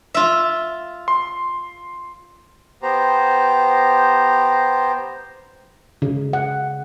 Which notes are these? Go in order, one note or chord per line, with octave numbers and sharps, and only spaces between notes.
F4 E5
C6
B3 G4 C5 A#5
C#3
F#5